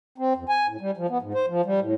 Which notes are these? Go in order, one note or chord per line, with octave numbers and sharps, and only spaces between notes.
C4
F2
G#5
A2
G3
F3
B3
G#2
C5
F3
G3
A2